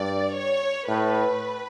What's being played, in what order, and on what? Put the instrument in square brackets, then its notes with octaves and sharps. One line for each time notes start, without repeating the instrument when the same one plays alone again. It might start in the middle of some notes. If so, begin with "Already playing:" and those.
Already playing: [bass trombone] G2 [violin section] D5
[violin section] C#5
[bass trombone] A2 [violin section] B4